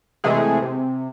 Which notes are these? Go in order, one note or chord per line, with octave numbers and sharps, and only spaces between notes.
C3 E3 G#3 A3 G#4
C3